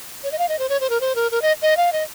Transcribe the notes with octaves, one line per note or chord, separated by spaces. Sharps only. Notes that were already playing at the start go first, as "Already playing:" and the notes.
C#5
D#5
F5
D#5
C5
C#5
C5
A#4
C5
A#4
A#4
D#5
D#5
F5
D#5